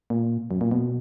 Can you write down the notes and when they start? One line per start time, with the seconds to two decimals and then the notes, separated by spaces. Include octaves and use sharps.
0.10 A#2
0.51 F#2
0.61 A#2
0.71 B2